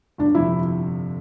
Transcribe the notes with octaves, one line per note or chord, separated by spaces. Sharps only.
G1 D4
F2 C3 F3 E4